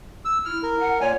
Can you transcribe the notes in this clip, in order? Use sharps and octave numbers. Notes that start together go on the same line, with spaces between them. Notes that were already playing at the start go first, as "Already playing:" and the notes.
E6
E4 F6
A#4
F#5
A#2 C#5 G#5